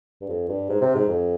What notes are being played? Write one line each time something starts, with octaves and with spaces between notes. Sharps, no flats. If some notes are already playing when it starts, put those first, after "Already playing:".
G2
F2
G2
G#2
C3
G#2
F2